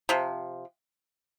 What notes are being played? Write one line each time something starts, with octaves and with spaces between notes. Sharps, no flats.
C3 F3